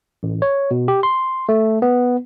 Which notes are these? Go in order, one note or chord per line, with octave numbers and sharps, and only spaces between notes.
A1
C#5
B2
G4
C6
A3
B3